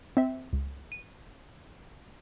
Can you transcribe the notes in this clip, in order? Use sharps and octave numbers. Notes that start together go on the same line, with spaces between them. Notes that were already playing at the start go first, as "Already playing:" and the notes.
C4 E5
C#2
D#7